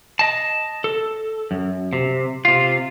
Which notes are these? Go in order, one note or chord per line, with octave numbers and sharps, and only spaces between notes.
D#5 A5
A4
F#2
C3
C3 F4